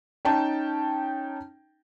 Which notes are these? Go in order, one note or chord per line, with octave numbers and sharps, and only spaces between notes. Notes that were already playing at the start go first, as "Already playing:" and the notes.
C#4 D#4 G5 A5